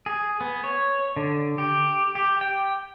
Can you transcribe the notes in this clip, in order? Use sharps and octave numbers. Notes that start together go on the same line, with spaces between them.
G#4
B3
C#5
D3
G4
G4
G5